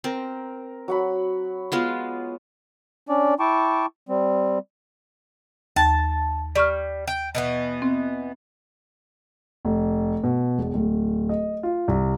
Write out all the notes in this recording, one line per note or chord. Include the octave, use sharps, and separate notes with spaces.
C4 A#4
F#3 F#5 B5
G#3 B3 F4
C#4 D4 D5
E4 G5 A5 C#6 D6
G3 C4
D#2 A5 A6
G3 D5 C#6 F6
G5
B2 E3 B3
C4
F1
B2
E1
D1
D#5
F4
C2